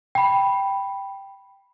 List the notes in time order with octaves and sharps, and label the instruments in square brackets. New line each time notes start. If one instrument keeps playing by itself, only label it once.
[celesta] G5 B5